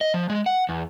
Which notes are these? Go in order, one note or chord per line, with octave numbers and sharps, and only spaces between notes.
D#5
F3
G#3
F#5
E2